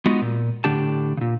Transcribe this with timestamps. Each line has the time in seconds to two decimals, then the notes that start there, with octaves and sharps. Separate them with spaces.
0.06 G#3 B3 D#4 F4 F#4
0.21 A#2
0.64 A2 D3 D4 G4 A5
1.17 A#2 C#3